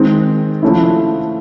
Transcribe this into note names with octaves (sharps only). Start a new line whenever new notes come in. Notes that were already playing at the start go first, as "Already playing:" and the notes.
Already playing: D#3 G#3 C4
F3 A3 C#4 E4